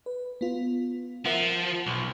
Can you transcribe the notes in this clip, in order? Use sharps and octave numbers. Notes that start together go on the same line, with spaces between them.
B4
B3 F4
F3 A#4 E5 F#5
B1